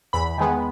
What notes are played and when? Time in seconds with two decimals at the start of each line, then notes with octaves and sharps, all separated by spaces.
0.13 E2 B5
0.38 D#3 G#3 B3